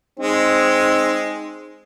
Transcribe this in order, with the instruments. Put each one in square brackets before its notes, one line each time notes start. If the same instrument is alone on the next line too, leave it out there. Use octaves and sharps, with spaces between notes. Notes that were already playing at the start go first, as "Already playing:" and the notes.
[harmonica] G#3 [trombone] C4 [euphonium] D#4